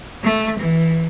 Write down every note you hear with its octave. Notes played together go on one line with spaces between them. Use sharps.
A3
E3